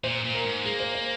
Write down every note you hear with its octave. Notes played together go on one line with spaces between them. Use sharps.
A#2 C5
A#2
A#4
G#2
A#3 G#4
C5
C5